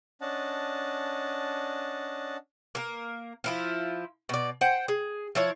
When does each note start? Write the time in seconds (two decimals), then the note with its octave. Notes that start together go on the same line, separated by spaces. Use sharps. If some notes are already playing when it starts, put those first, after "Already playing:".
0.21 C#4 D4 D#5 F#5 A5
2.75 A#3 A#4
3.44 F3 E4 F4
4.29 B2 D5
4.61 C5 F#5 G5
4.88 G#4
5.35 F3 E4 C#5